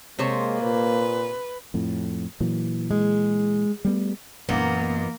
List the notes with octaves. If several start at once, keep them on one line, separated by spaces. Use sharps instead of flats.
C3 G#3 A#3 C5 C#5
A#2 B4
F2 A2
A#2 E3 F#3
G#3
G3 A3 B3
F#2 A#2 E3 A#3 B3 D#4